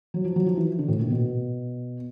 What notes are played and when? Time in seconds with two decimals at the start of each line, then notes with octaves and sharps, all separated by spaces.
0.14 F#3
0.24 F3
0.36 F#3
0.46 F3
0.57 E3
0.78 D3
0.88 A2
0.99 A#2
1.10 B2